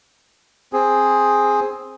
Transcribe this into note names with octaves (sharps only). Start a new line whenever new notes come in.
C4 G#4